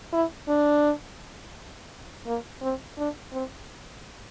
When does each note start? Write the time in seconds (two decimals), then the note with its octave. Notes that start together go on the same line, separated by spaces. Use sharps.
0.13 E4
0.48 D4
2.26 A#3
2.62 C4
2.98 D4
3.32 C4